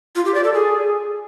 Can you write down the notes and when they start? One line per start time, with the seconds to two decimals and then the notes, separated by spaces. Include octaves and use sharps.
0.16 F4
0.25 G4
0.35 D5
0.44 A4
0.53 G#4